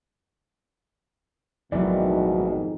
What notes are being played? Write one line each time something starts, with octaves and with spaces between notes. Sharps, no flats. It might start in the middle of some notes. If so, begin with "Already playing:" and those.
A1 F2 G#2 B2 D#3 E3 F#3 D5